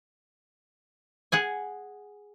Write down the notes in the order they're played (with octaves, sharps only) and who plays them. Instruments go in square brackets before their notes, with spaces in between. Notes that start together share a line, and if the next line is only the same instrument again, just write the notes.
[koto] G#4 F#5 G#5